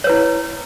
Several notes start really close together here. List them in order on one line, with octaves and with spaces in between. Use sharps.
C#5 B4 E4